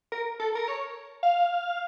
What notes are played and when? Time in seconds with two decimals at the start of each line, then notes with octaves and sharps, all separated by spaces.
0.12 A#4
0.40 A4
0.55 A#4
0.68 C#5
1.23 F5